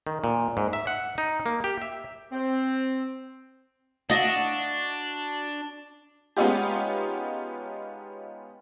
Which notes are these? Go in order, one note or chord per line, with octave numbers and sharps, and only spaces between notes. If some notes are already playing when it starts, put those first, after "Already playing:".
D#3
A#2
G#2
E5
F#5
D#4
A#3
G4
E5
C4
D4 F#4 D#5 E5
G#3 B3 C#4 D#4 F4 G4